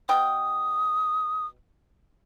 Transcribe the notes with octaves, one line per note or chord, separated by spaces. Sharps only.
B2 G5 D#6